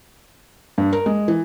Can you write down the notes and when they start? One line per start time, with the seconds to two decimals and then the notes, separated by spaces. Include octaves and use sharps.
0.78 G2
0.93 A#4
1.06 G#3
1.28 E3